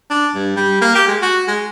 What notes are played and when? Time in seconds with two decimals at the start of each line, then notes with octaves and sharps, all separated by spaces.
0.11 D4
0.35 G2
0.57 G3
0.81 A#3
0.95 G4
1.08 G#3
1.22 F#4
1.48 G#3